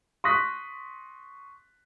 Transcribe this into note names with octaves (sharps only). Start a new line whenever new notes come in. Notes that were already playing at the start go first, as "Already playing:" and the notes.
C6 C#6 D#6 F#6 A#6 B6